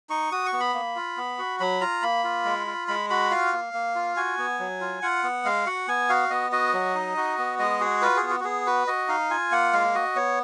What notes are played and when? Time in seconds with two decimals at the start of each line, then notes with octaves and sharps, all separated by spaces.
0.10 D#4 C#6
0.32 F#4 D#6
0.46 C#6
0.53 B3
0.60 B5
0.74 A#3
0.96 F4
1.17 B3
1.39 F#4
1.60 F#3 B5
1.81 F4 A#5
2.02 A#3 B5
2.24 F4
2.45 G#3
2.67 F4
2.88 G#3 B5
3.10 F#4 B5
3.31 F4 F5
3.53 A#3
3.74 A#3
3.95 F4
4.17 F#4 G#5
4.38 B3
4.59 F#3
4.81 F4
5.02 F4 F#5
5.23 B3
5.45 G#3 F5
5.66 F#4 F#5
5.88 B3 G#5
6.09 F#4 F5
6.30 B3 D#5
6.52 F#4 D#5
6.74 F#3
6.95 D#4
7.17 F#4
7.38 B3
7.59 G#3 D#5
7.80 F#4 G#4
8.02 F4 B4
8.16 G#4
8.23 B3
8.30 F#4
8.40 F#4
8.44 B3 G#4
8.67 F#4 B4
8.87 F#4 D#5
9.08 D#4 F5
9.30 F4 G#5
9.52 A#3 F#5
9.73 G#3 F5
9.95 F#4 D#5
10.16 B3 C#5